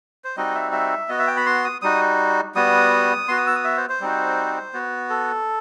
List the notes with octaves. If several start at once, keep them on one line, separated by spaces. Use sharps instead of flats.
C5
G3 C4 D#4 F#4 D#5
E5
E5
B3 F#4 D#5
E5
G5
B5
C6
D#6
G3 D#4 F#4 D#6
G3 B3 F#4 D#6
B3 F#4 C6
D#6
E6
D#6
E5
C5
C5
G3 C4 D#4 F#4
B3 F#4
A4